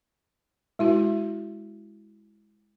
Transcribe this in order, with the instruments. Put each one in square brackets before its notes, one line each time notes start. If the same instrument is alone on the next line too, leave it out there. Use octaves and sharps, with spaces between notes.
[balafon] G#3 E4 F#4